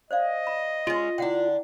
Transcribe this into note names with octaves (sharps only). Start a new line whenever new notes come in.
C5 D5 D#5 F5
B5
G#3 C#4 F4
D3 D4 E4 F#5 G5